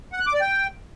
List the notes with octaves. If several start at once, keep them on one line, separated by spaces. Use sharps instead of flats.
F#5
F#6
D6
D5
G5